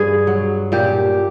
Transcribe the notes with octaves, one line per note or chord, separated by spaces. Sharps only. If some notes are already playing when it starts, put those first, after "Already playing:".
Already playing: G2 G#4
F#3
A#2 G4